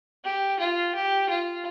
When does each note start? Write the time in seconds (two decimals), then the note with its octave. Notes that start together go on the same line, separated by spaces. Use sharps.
0.24 G4
0.60 F4
0.95 G4
1.30 F4